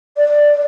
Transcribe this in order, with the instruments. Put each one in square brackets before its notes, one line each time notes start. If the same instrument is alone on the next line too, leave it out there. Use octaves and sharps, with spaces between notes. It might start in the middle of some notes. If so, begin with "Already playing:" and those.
[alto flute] D5